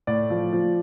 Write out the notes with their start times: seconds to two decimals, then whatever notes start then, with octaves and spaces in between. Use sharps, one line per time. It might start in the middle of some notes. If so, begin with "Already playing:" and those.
0.07 A2 D5
0.30 F3
0.53 F3